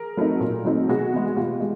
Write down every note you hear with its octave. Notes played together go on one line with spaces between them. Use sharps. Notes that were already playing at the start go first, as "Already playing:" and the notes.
Already playing: G#4 A#4
F#3 A3 C4 D#4
A#2
F#3 A3 C4 D#4
B2 F#4 G#4
G#3 B3
G#4
B2 F4 G4
G#3